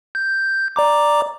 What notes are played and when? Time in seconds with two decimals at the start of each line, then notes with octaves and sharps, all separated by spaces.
0.15 G6
0.76 D5 A#5 D6